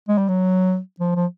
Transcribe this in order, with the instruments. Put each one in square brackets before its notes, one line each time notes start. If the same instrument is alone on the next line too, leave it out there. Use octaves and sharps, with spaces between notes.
[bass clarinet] G#3
G3
F#3
F3
F3